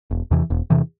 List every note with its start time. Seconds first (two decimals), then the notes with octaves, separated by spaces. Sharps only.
0.11 E1
0.31 E2 C3 E3
0.50 E1
0.70 E2 C3 E3